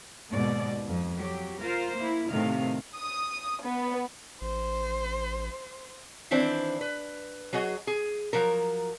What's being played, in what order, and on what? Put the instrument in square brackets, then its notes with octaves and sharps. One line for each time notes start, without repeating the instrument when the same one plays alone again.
[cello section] D#2 G#2 B2 D5
F2
F#3 G4
F4 A#4 C5
A#3 E4
A2 C3 D#3 A3 F5
[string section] D#6
B3
[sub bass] A1 [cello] C5
[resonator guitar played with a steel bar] D#3 E3 C4 D4 E4 C5
B4
F#3 F#4 G#4 D#5
G#4
F3 F#3 A#4